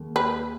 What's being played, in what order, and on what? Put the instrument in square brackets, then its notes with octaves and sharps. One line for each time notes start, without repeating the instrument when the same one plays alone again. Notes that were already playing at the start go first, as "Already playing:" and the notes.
Already playing: [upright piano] D#2 D#3 G#3
[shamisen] B4